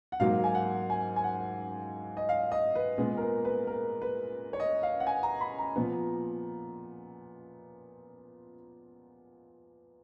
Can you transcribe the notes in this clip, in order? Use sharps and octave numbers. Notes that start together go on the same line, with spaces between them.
F#5
G#2 F#3 A#3 F5
G#5
F#5
G#5
G#5
F#5
D#5
F5
D#5
B4
A#2 G#3 B3 G#4
A#4
B4
B4
A#4
B4
C#5
D#5
F5
F#5
G#5
A#5
B5
A#5
A#2 F3 B3